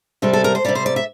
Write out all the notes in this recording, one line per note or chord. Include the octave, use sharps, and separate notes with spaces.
C3 G3 A4
A4
A#4
C5
C3 G3 D5
C5
D5
E5